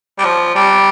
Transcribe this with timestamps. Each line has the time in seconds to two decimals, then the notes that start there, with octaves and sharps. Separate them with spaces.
0.18 G3
0.24 F3
0.55 G3